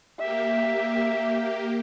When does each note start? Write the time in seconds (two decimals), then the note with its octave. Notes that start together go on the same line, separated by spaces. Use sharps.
0.19 A#3 G4 E5